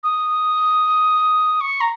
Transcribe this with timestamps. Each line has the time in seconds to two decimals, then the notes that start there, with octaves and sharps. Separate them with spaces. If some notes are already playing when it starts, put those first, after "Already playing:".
0.03 D#6
1.61 C#6
1.81 A#5